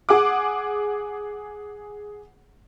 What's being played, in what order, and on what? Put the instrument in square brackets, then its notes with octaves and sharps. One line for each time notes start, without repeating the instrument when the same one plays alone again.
[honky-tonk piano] G#4 F#5 D6